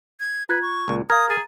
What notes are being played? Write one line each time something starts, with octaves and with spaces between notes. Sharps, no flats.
G#6
F4 B4 F#6 G#6
C#6
C#2 A#2
A#4 F5 D#6 G#6
G#4 A#5 A6 D#7